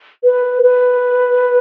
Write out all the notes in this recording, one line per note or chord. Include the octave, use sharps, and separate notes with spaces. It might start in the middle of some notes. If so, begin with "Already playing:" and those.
B4
B4